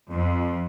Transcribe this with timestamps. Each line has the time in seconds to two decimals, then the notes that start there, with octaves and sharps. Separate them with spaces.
0.11 F2